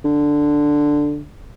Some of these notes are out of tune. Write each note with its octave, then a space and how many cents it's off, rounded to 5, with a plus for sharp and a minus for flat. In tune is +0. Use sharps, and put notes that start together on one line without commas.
D3 +0